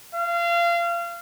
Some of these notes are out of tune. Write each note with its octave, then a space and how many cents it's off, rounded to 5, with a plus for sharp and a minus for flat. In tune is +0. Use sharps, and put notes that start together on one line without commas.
F5 -30